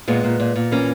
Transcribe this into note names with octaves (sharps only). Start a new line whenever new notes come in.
A#2 G#3 B3
A#2
A#2
A#2
E3 A#3 C#4